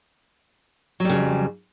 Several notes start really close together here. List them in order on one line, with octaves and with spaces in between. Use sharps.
F#3 G3 C#3 F2